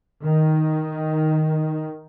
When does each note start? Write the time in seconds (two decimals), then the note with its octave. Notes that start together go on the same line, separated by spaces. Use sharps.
0.21 D#3